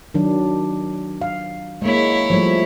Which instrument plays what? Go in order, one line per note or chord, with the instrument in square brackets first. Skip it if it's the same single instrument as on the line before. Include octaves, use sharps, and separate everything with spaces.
[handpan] D#3 F#3 D4
F5
[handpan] G#3 A#3 [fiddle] E4 C#5
[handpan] F3 G3 A3